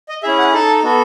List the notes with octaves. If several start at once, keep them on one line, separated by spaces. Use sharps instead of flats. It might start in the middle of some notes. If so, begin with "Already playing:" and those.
D#5
C#4 E4 G#4 E5
F#5
D#4 A4 A5
B3 F#4 A4